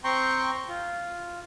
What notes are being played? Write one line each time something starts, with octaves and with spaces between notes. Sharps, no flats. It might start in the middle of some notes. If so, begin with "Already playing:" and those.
C4 G5 A#5 C6 C#6
F4